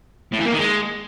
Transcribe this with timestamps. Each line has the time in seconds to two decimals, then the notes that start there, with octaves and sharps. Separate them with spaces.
0.33 A2
0.39 E3
0.46 A#3
0.52 D#3
0.59 G#3